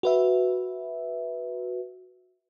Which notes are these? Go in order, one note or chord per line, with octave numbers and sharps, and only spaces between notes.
F#4 B4 E5